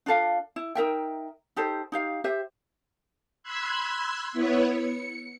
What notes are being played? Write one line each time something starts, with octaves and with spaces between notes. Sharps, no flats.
D4 F4 A4 F5
E4
D#4 A#4 E5 G5
D#4 G4 A4 C5
D#4 G4 F5
G4 C5 E5
B5 C6 E6 F#6 G#6
B3 E4 B4 C#5
C#7